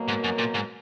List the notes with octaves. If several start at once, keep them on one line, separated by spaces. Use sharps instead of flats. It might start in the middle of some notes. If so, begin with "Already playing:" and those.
Already playing: B2 F#3 A#3
G#2
F#2
A#2
G#2